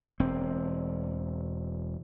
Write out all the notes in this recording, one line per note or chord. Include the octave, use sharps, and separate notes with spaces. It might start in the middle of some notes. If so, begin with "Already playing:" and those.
E1 C4